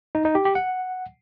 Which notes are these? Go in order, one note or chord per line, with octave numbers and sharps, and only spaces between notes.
D#4
D#4
G4
G4
F#5